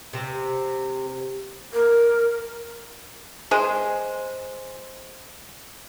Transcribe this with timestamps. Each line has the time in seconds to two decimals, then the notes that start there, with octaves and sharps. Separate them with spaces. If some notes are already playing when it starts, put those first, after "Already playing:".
0.13 C3 C4
1.73 A#4
3.51 G#3 G#4 C5